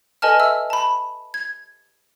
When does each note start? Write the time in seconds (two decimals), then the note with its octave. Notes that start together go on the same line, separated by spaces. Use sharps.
0.22 A4 B4 D#5 G#5 A5 F6
0.40 E5 E6
0.70 A5 B5
1.34 G#6